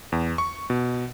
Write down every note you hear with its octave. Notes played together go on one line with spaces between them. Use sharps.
E2
C#6
B2